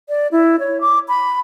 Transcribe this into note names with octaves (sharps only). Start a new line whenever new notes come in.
D5
E4
C#5
D6
B5